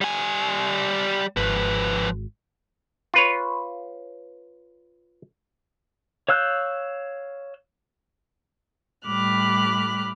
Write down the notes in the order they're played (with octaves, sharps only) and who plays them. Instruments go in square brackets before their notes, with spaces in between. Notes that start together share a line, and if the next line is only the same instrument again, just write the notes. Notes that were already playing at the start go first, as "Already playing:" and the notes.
[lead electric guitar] G3 G#5
[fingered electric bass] G#1 [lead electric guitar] F3 B4
[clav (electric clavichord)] F4 B4 C#5
[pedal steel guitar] C#5 F5 E6 F#6 G6
[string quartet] A2 G3 B5 D6 F6 F#6